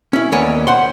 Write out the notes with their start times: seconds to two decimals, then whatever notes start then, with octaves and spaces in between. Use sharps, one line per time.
0.13 C#4 E4
0.32 D#2 B3 C#5 D5 G#5
0.67 C5 F#5 C6